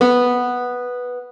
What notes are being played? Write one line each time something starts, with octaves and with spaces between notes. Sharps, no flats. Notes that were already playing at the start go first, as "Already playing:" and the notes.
B3